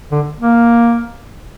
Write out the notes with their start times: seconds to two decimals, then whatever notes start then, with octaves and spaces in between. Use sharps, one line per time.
0.12 D3
0.40 A#3